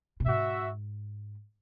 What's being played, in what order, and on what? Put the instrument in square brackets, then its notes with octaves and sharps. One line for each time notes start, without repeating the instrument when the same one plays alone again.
[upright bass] B2
[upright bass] G#2 [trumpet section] F#4 E5